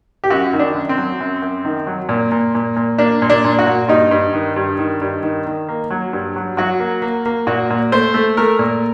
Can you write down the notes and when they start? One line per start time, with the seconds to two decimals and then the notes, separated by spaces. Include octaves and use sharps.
0.24 G4
0.30 F#2 F#4
0.53 D#3
0.59 D4
0.74 F#2
0.89 C4
0.98 F#3
1.20 F#2
1.42 F#2
1.65 D#3
1.87 F#3
2.09 A#2
2.32 A#2
2.55 A#2
2.76 A#2
2.98 A#3 D4
3.22 A#2
3.30 D4
3.44 A#2
3.59 F#4
3.67 A#2
3.88 G2 D#4
4.11 G2
4.33 D#3
4.56 G2
4.79 D#3
5.01 G2
5.23 D#3
5.46 D#3
5.69 A#3
5.90 F#3
6.13 G2
6.36 F#3
6.57 F#3 F#4
6.80 A#3
7.02 A#3
7.26 A#3
7.47 A#2 F#4
7.70 A#2
7.92 A3 C5
8.14 A3
8.37 A3 A#4
8.59 A#2